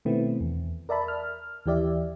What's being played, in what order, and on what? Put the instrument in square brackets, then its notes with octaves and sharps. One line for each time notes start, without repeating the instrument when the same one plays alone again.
[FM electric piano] B2 D#3 A3 B3 C4 E4
E2
A#4 D5 E5 A5 B5
F6
D#2 E3 G4 D5 E5